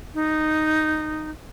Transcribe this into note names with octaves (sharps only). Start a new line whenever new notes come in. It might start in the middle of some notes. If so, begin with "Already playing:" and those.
D#4